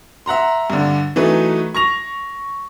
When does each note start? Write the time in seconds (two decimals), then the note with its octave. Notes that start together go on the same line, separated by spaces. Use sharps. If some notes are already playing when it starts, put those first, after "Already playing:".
0.26 E5 F#5 A#5 C6
0.70 G2 D3
1.16 E3 F#3 A3 D#4 B4
1.75 C#6 A#6 F7